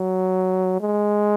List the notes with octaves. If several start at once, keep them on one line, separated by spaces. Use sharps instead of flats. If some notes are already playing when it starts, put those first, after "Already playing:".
Already playing: F#3
G#3